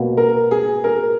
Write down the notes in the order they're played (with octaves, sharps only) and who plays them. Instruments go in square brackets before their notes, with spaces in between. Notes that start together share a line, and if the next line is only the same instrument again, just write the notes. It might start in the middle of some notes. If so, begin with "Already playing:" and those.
Already playing: [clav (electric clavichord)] B2 A#3 F#4
[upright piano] A#4
G#4
A#4